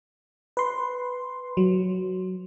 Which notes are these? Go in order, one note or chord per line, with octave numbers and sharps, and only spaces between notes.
B4 C6
F#3